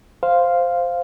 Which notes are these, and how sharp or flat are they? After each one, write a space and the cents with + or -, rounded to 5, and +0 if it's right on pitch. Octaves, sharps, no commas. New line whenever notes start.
C5 +0 F5 +0